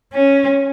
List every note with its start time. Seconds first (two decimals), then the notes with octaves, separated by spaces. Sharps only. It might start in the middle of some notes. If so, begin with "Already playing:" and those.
0.14 C#4